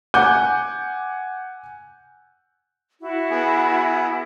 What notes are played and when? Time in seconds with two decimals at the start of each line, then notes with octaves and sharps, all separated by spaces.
0.14 F#5 G#5 D6 F#6 G6
3.00 E4 F#4
3.31 B3 G#4